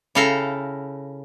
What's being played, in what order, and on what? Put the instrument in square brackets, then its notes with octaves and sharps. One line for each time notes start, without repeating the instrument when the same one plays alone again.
[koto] C#3 E4 A4 F5 G5 A#5